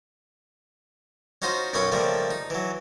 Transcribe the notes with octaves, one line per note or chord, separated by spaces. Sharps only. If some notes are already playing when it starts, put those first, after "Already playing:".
C#4 D#4 F4 F#4 C5 D#5
B1 F#2 B3 C#4 C#5 B5
C#3 F3 G3 A3 A#3
D#4
E3 F#3